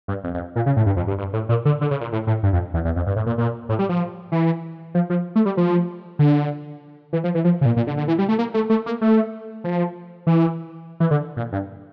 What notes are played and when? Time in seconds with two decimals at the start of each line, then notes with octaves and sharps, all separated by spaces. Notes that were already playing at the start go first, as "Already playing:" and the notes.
0.08 G2
0.24 F2
0.34 F2
0.56 A#2
0.66 C#3
0.77 A2
0.86 G2
0.97 F2
1.07 G2
1.18 G2
1.33 A2
1.49 A#2
1.65 D3
1.81 D3
1.91 C#3
2.01 A#2
2.12 A2
2.27 A2
2.43 G2
2.53 F2
2.74 E2
2.85 E2
2.96 F2
3.06 G2
3.16 A2
3.26 A#2
3.38 A#2
3.69 A2
3.79 G3
3.89 F3
4.32 E3
4.95 F3
5.10 F3
5.36 A3
5.46 G3
5.57 F3
6.19 D3
7.13 E3
7.24 F3
7.35 E3
7.44 F3
7.61 C#3
7.66 A#2
7.76 A#2
7.87 D3
7.97 D3
8.08 E3
8.18 G3
8.29 A3
8.39 A#3
8.54 A3
8.70 A3
8.86 A#3
9.01 A3
9.64 F3
10.27 E3
11.00 E3
11.11 D3
11.37 A#2
11.52 G2